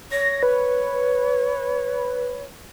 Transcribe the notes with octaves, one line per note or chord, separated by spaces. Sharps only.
C#5 A#6
B4